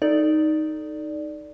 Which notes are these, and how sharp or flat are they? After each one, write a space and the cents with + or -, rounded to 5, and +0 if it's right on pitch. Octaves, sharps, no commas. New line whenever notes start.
D#4 +0 A4 +0 D5 +0